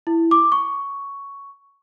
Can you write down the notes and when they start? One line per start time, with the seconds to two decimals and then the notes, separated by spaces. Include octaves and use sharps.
0.07 E4
0.31 D6
0.52 C#6